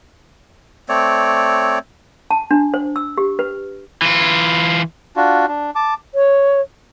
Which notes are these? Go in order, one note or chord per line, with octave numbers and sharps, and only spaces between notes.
A3 C4 C#5 D5
A5
D4
C5
E6
G4
B4
E3 F4
D4 F4 F#4
D4
A5 D6
C#5